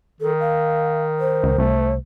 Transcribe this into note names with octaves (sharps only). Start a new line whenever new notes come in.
D#3 A4
F5
C5
C#2
C2 A3